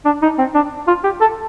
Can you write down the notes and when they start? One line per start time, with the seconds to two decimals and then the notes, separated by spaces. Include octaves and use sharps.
0.05 D4
0.22 D#4
0.38 C4
0.55 D4
0.88 F4
1.04 G4
1.21 A4